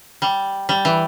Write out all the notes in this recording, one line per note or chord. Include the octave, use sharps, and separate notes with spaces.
G3
G3
E3